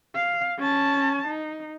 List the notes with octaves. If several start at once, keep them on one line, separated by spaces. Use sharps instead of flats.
F5
C#4 A5
D#4